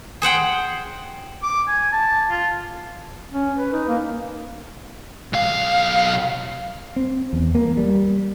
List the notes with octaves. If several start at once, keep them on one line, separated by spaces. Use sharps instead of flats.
G#4 C5 F#5 G5
D6
G#5
A5
F4
C#4
B4
D#4
A#3
B1 F5
C4
E2
A#3
G3